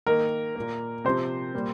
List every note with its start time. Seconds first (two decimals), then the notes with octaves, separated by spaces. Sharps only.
0.07 D#3 A#3 A#4
0.56 A#2 A#3
1.05 C3 F3 C4 C5
1.54 A#2 G3 A#3